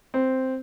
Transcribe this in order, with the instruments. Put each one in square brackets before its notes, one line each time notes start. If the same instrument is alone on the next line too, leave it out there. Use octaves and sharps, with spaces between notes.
[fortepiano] C4